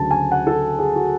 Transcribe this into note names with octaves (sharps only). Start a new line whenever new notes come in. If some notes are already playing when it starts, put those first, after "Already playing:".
Already playing: D2 C#3 F#3 A5
G#5
F#5
A4
G#4
F#4